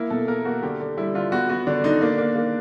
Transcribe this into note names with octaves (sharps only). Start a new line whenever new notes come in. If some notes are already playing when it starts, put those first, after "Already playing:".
Already playing: A#3 E4
B2 A4
A#3 A#4
A#3 F#4
D3 G4
D3
G3 E4
D3 F4
B3 F#4
B3 F#4
D3 D4
D3 D#4
A#3 D4
A#3
A#3